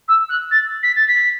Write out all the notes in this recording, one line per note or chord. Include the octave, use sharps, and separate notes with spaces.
E6
F#6
A6
B6
A6
B6